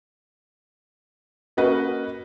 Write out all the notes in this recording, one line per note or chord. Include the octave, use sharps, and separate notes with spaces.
A#3 C#4 F#4 B4 D#5 F#5